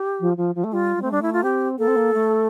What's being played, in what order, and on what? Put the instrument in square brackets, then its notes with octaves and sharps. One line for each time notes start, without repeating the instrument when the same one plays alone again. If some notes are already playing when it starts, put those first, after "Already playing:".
Already playing: [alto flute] G4
[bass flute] F3
F3
F3
A3
[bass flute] G3 [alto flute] F4
[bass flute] G3
[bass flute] A3 [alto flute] C4
[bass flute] G3 [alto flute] D4
[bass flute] A3 [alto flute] E4
[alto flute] F4
[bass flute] C4 [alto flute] G4
[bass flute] A#3 [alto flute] A4
[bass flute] C4
A#3
A3